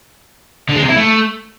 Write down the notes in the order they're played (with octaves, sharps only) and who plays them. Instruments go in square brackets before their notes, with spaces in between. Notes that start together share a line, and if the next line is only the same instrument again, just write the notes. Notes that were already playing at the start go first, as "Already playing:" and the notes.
[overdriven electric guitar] D3
G#3
C3
E4
A3